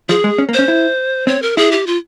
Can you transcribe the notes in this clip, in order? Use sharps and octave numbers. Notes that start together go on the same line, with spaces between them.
F3 G#4
G#3
C#4
A#3
C5
C#4
E4
C4 C#5
A#4
E4 G#4
G4
F4